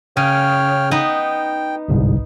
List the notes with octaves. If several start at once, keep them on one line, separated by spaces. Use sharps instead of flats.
C#3 C#5 G5 F6
B3 D#4 G5
G1 C2 G#2